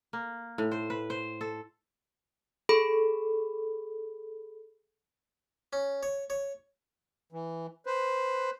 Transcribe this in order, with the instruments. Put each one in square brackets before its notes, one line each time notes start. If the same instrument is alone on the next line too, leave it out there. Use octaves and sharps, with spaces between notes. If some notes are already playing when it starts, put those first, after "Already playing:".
[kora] A#3
A2
C5
B4
C5
A4
[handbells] G#4 A4 B5
[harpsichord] C#4
C#5
C#5
[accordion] E3
B4 C5